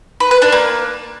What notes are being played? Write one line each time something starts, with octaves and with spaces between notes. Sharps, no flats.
B4
B4
D4
A#3